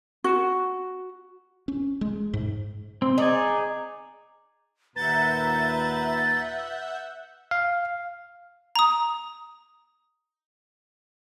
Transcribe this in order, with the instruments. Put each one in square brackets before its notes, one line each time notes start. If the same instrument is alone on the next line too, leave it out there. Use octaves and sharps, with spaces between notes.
[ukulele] F#4
[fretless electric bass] C#4
G#3
G#2
[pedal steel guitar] C4
[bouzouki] D#4 [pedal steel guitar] G#4 D5 G#5
[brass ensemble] D#2 A#2 A#5 [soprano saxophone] B4 [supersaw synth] E5 F#5 G6 [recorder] A6
[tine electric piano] F5
[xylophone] A#5 D#6